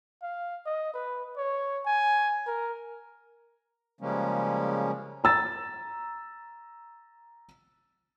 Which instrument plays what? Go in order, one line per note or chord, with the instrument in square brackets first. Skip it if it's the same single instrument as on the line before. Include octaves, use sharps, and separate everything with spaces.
[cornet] F5
D#5
B4
C#5
G#5
A#4
[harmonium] C#3 F3 G3 G#3 A#3 C#4
[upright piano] A#5 E6 A6